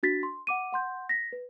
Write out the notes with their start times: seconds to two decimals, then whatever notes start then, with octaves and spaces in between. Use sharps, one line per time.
0.03 D4 F#4 A6 B6
0.23 C6
0.47 F#5 D6 D#7
0.72 F#5 C6 G6
1.09 A#6 B6
1.32 B4